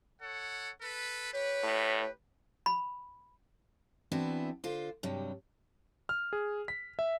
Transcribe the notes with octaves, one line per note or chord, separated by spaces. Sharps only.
A4 C#5 F#5
A4 B4
G4 B4 C#5
A2
B5
E3 B3 C4 D4 E4 F#4
D3 F4 C5
G2 C3 F#3 G3
F6
G#4
B6
E5